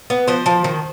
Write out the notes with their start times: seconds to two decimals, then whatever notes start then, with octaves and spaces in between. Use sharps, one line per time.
0.10 B3
0.28 F3 C5
0.46 F3
0.64 D#3